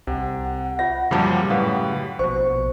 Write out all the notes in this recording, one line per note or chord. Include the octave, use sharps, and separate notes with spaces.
C2 C3 F#5
F4 C#5 E5 A#6
F#2 A#2 C#3 F3 G3 G4 A5 B5
F#2 A2 B4 F5
A#1 B2 C5 C#6